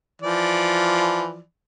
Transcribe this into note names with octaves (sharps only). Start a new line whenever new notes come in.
E3 F3 D5